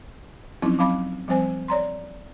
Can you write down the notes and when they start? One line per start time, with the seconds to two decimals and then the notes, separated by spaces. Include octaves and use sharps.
0.62 F3 F#3 C4 C#4 D#4 E4
0.79 F#3 C4 F5 B5 D6
1.28 F3 G3 C4 C5 G#5
1.68 C#5 D5 A#5 C6